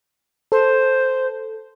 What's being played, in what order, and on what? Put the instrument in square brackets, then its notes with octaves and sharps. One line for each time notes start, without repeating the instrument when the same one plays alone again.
[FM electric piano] A4 [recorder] C5